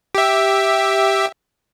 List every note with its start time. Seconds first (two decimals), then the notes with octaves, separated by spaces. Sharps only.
0.15 G4 E5